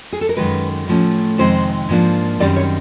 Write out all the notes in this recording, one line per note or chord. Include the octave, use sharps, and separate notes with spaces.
G#4
A4
A#4
F#2 D#3 G#3 B4
A2 F3 A3 C#4
F2 C3 D#3 G#3 C4 C5
G#2 F3 A#3 D4
F#2 D#3 G3 C4 D5
C#5